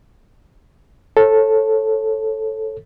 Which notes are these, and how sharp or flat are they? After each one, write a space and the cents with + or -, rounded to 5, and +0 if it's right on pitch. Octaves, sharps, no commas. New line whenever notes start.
A4 +0 C#5 -30